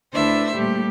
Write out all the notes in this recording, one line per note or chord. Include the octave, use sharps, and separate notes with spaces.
D2 D4 E4 B4 C5 E5
A#2 G3 A3 G4